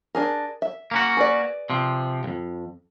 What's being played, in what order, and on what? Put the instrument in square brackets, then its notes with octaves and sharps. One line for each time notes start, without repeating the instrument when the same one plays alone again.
[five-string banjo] D4 G#4 A#4
E5
[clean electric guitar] A#3 C#4 F#4
[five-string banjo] G#4 B4 D5
[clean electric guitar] C3 F3
C2 F2